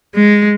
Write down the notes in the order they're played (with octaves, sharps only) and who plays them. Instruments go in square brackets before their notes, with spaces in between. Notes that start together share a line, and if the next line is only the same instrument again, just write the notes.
[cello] G#3